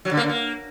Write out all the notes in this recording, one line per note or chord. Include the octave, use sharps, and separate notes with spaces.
F#3
D3
A#3
D3
A#3